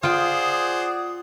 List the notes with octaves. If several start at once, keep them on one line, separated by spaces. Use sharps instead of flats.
F4 G#4 C5 D5 F#5 G5 D#6